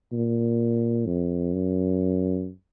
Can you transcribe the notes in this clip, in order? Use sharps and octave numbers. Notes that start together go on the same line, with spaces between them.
A#2
F2
F#2